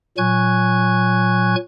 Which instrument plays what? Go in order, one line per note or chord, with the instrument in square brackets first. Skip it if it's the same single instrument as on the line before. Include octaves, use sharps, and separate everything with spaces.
[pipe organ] A#2 F#3 G#5 C#6 F#6 G#6